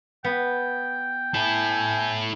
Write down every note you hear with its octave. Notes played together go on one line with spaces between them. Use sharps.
B3 G5
E4 A4 G#5